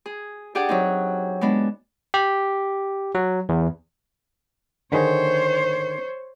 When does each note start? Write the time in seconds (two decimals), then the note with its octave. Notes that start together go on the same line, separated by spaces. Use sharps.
0.06 G#4
0.55 D4 G4 G#4 D5 F#5
0.69 F#3 C4 D#4
1.41 G#3 B3 D4
2.14 G4
3.15 F#3
3.49 E2
4.92 D3 D#3 G#4 C5 C#5